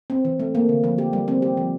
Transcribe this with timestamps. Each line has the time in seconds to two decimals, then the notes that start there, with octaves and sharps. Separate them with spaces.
0.10 C4
0.25 E3
0.40 A3
0.55 A#3
0.69 D3
0.84 F3
0.98 G4
1.13 G3
1.28 C4
1.42 G4
1.57 F3